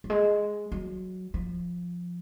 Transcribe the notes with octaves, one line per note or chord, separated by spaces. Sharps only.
F#3
G#3
F#3
F3